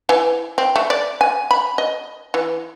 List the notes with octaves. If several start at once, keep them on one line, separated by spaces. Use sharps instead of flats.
E3
C4
A3
D5
G#5
B5
D#5
E3